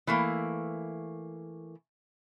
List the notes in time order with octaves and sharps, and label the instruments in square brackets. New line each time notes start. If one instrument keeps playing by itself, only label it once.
[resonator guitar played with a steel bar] E3 A3 A#3